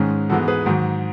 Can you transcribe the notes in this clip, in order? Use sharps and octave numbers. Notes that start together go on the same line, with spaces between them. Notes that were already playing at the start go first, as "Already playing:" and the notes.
Already playing: G#2 D#3 G#3 C#4
G#2 E3 G#3 B3 F#4 A4
G#4 B4
G#2 D#3 F#3